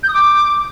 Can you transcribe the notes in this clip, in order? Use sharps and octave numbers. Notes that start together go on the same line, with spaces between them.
G6
D#6
D6